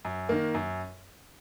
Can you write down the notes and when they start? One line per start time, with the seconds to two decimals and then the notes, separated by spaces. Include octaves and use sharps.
0.05 F#2
0.29 D#3 A#3
0.54 F#2